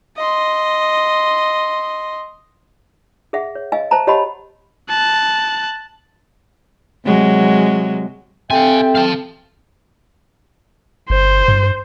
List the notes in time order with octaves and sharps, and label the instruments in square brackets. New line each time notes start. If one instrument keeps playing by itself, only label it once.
[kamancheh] D#5 C6
[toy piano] G#4 E5 F#5
C#5
D#5 F5 G#5
C5 E5 A5 A#5
G4 C#5 D#5 F#5 A5 B5
[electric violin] A5 F#6
[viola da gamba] C3 F#3 G#3
[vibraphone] C4 A4 [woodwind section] G4 E5 G5 [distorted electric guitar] F5 G#5
[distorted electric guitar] F5 A5
[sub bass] G1 [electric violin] C5
[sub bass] G2